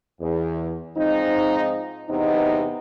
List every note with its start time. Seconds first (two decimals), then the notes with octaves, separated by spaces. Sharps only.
0.21 E2
0.97 G#2 F3 C4 D#4
2.09 E2 C3 B3 D#4